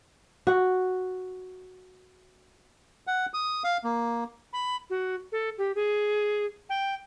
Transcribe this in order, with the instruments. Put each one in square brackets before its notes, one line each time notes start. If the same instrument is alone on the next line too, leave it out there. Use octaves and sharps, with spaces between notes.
[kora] F#4 F#5
[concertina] F#5
D#6
F5
A#3
[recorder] B5
F#4
A4
G4
G#4
G5